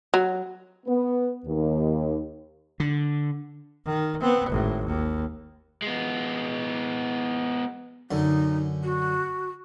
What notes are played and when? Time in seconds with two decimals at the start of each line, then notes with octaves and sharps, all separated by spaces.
0.14 F#3
0.86 B3
1.46 D#2
2.80 D3
3.86 D#3
4.20 B3 C4
4.50 G#1 A2
4.86 D#2
5.82 G#3 B3
8.11 F#2 D3 D#4
8.84 F#4